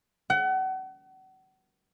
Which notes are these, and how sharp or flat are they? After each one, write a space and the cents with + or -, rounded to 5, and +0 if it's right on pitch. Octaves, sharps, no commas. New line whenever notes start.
F#5 +35